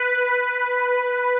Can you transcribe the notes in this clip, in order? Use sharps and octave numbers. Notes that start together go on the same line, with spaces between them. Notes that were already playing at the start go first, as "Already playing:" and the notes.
Already playing: B4